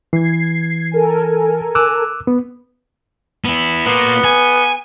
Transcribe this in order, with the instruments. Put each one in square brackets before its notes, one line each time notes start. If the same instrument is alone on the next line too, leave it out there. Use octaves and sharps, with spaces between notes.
[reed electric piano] E3 [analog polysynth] G#6 C7
[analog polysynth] A4 A#4 G#5
[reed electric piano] D6 E6 F#6
B3
[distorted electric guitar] B3 E4
[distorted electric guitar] A#3 F4 [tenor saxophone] B3
[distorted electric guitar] G#5